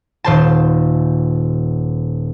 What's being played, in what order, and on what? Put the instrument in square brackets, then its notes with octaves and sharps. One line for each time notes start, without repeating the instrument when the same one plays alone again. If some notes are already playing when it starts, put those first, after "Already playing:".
[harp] D#1 C5 A5